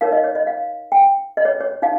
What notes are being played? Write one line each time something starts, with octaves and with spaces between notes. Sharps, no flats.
D#4 A#4 C#5 F5
D#5
C#5
D#5
F5
G5
D#5
C#5
C#5
D#4 F5